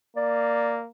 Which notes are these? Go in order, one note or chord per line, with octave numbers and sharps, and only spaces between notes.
A#3 D5